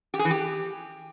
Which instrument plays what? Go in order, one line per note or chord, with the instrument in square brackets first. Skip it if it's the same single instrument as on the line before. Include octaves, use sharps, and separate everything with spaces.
[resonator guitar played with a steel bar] G4
G#4
E3
G4